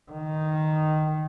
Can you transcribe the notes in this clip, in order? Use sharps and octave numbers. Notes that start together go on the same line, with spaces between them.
D#3